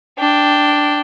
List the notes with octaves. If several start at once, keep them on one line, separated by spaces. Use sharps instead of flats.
D4 G5